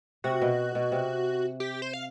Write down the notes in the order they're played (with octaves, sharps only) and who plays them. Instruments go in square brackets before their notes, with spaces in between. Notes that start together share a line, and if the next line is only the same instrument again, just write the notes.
[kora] C3 [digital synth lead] F#4
[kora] B2
B2
C3
[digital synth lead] G4
C5
F5